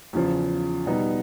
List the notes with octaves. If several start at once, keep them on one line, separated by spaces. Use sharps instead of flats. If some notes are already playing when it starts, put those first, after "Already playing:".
E2 C#3 F3
B2 G3 B3 D#4